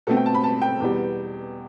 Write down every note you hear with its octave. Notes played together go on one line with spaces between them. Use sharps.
B2 A3 C4 A4
G5
A5
B5
A5
G5
E2 B2 G3